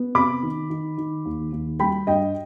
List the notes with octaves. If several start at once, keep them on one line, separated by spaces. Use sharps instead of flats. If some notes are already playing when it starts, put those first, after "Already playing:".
Already playing: B3
C3 B5 D6
D#3
D#3
D#3
D#2
D#2
G3 G5 B5
G2 D#5 G5